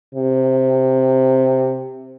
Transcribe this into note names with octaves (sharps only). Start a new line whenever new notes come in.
C3